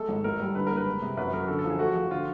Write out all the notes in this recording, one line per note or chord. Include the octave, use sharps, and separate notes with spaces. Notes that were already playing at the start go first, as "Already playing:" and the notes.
Already playing: G#3 A3 A4
G#1
A1 A#4
G3
D3 B4
F#1 A#4
B4
G#3
C3
F#2 B4
F#3 A#4
D3 A4
A4
F3
G#4
A3 F#4
F3
D3 F4